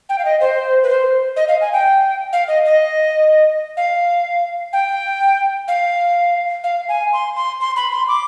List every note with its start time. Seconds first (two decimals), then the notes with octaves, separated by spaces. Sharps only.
0.09 G5
0.19 F5
0.25 D#5
0.41 C5
0.83 B4
0.89 C5
1.36 D#5
1.48 F5
1.61 G#5
1.73 G5
2.33 F5
2.48 D#5
2.65 D#5
3.77 F5
4.73 G5
5.68 F5
6.64 F5
6.89 G#5
7.13 C6
7.36 C6
7.60 C6
7.76 B5
7.92 C6
8.08 D6